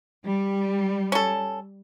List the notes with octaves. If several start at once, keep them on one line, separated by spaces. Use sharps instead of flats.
G3
C#4 A4